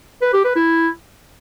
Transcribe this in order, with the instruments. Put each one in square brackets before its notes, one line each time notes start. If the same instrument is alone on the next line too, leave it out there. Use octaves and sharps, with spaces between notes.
[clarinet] B4
G4
B4
E4